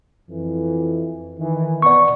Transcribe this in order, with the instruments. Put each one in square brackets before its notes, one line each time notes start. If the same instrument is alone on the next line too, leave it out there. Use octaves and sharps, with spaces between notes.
[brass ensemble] F2 E3
D#3 E3
[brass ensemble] B3 [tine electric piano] D5 C#6